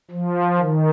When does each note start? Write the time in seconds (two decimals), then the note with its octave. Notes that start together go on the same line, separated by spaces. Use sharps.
0.11 F3
0.59 D#3